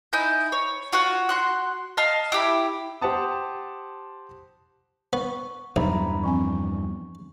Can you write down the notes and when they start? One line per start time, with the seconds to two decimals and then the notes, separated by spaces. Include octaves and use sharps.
0.13 D#4 E4 G#5 G6
0.52 C#5
0.92 F4 F#4 C#5 F#5
1.29 F#4 C6 F#6
1.97 D#5 F5 A5 F6
2.32 E4 G4 B5
3.01 G4 C5 F#5 A5 D#6
5.13 B3 C#6
5.76 B1 E2 G2 E5 A#5 B5
6.24 F3 C4 G#5 C#6